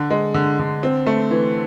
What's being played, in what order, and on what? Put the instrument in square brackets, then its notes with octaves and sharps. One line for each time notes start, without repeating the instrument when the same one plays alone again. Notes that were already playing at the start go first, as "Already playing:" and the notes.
Already playing: [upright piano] D3
G#3
D3
D3
C4
A3
E3